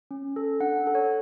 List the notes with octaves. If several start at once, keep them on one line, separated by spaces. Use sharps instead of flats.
C#4
A4
D4 F#5
A4
C#5